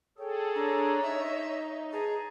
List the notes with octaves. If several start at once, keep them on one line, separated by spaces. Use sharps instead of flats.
G#4 A4 C#5 G5
D4 C#5 A#5
D#4 D#5 E5
E2 G#4 A5 A#5